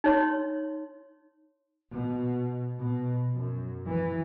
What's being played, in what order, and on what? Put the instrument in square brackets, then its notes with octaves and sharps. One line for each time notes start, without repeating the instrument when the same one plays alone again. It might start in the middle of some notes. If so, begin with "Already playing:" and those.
[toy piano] D#4 C#5 C6
[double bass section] B2
B2
F#2
E3